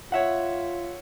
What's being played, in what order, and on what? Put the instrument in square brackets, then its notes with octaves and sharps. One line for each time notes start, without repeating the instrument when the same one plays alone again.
[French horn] F4 [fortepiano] C#5 E5 F#5